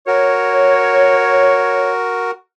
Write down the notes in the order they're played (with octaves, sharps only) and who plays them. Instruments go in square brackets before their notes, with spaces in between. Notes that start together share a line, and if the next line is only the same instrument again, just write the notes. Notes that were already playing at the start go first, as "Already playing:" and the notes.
[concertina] F#4 A#4 [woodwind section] C#5